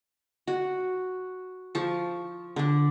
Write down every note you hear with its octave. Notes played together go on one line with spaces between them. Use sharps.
F#4
F3 A5 C#6
D3 D4